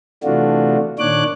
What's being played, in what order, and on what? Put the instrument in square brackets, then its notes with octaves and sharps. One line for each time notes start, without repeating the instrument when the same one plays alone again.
[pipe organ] C3 E3 A3 D4 F4 F#4
A#2 D#3 D4 C#5 D6 F#6